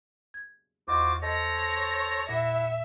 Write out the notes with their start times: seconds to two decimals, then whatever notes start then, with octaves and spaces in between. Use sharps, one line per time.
0.34 G#6
0.88 E2 F4 F#4 C5 D#5 D6
1.22 A4 C5 C#5 D#5 A#6
2.29 A#2 E4 E5 F#5